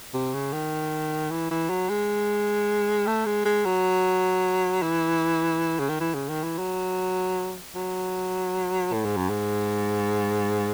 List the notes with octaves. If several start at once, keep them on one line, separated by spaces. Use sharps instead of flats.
C3
C#3
D#3
E3
E3
F#3
G#3
A3
G#3
G#3
F#3
E3
C#3
D#3
E3
C#3
D#3
E3
F#3
F#3
A2
G#2
F#2
G#2